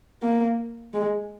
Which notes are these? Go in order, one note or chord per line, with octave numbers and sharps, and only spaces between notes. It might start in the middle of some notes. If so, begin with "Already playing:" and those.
A#3
G#3